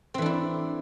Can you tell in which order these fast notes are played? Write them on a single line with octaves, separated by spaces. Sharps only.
C4 E3 D4 E4